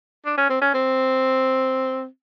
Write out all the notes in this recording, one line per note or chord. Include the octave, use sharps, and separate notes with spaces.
D4
C#4
C4
C#4
C4